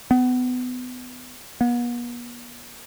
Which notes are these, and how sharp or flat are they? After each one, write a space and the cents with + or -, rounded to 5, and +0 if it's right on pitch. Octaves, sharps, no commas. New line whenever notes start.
B3 +25
B3 -45